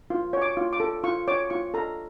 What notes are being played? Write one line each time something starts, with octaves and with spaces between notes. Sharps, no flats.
F4
C#5
D6
F4
D6
A4
F4 C#6
C#5 D6
F4 C#6
A4 A#5